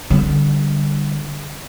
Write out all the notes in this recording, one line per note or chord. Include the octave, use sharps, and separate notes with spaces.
D3 G3